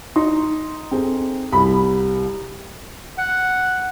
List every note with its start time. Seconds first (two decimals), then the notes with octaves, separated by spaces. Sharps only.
0.16 D#4 C6
0.91 C4 G#4 A4
1.52 C2 B5
3.18 F#5